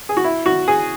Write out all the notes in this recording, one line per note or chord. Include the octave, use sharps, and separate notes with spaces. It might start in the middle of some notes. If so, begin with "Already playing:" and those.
G#4
F#4
E4
F#4
G#4